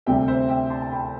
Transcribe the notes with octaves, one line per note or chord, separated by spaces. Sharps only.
D2 C3 G3 C4 E5 G5
C5 E5
E5 G5
A5 C6
A5
G5 B5